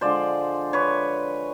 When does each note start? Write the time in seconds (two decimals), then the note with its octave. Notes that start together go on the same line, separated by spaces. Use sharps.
0.01 D3 F3 G#3 C5 D5
0.73 B4 C#5